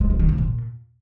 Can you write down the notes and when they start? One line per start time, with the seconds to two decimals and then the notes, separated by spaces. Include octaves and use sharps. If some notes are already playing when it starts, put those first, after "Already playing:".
0.01 G#3
0.10 F#3
0.19 D#3
0.29 F2
0.38 A#2